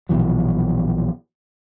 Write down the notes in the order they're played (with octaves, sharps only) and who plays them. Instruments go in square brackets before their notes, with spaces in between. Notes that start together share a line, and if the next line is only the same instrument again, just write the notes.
[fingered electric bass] A#1 B2 E3 F#3